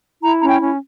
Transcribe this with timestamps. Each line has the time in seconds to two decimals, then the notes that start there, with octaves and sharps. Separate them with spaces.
0.22 E4 A#5
0.42 C#4 A#5
0.48 G5
0.62 C#4